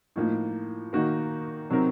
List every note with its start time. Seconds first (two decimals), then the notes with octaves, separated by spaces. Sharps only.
0.16 A2 F3 A#3 D#4
0.93 D#3 A#3 D#4 F#4 A#4
1.70 C3 F#3 C4 D#4 A#4